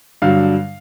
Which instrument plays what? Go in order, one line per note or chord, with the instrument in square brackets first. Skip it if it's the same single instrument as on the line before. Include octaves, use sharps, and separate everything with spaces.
[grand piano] G2 D3 F#3 F5